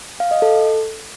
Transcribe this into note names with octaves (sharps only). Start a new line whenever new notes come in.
F5
D#5
A4